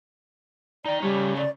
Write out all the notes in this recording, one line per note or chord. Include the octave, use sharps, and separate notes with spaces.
D#4 D5 G5
C#3 G3 A3 C#5
D5